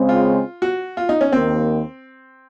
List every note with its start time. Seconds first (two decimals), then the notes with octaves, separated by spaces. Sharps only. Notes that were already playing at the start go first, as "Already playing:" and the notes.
Already playing: C#3 G#3 C4
0.09 F4
0.62 F#4
0.97 F4
1.09 D#4
1.21 C#4
1.33 D#2 D#3 A#3 C4